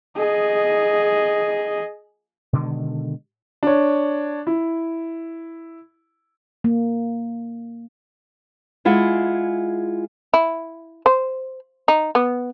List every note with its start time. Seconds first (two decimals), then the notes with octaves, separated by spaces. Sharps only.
0.17 G#4 D#5
2.53 B2 D3 D#3 G#3
3.63 D4 C#5
4.47 E4
6.64 A#3
8.85 G#3 E4 F4 G#4 F#5
10.34 E4
11.06 C5
11.88 D#4
12.15 B3